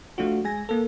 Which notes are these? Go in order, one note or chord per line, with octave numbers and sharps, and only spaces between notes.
F3 A3 D4 F4 F#4
G#3 G#5 A#6
A#3 A4